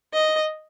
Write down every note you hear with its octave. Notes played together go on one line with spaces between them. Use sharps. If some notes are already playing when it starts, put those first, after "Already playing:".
D#5